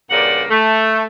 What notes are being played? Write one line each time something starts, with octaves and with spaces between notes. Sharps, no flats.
G2 A#2 C#3 A#3 D5 F#5
A3